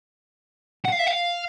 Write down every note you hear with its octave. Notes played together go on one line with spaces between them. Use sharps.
F#5
F5
E5
F5